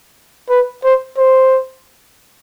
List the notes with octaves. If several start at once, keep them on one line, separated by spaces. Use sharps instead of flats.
B4
C5
C5